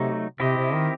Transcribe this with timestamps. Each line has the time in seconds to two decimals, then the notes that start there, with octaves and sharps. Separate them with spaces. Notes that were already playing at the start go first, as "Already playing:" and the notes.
Already playing: C3 F#3 A3 D#4
0.40 C3 C4 E4 G4 D#5
0.57 C3
0.74 D#3